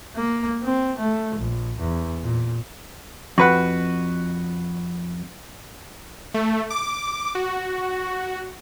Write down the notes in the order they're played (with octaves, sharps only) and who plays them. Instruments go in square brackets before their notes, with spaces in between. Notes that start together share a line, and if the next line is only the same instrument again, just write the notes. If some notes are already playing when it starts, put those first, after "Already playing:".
[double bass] A#3
C4
A3
A#1
E2
A#2
[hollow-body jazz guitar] F2 [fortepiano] F#4 B4 F#5
[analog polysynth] A3
D6
F#4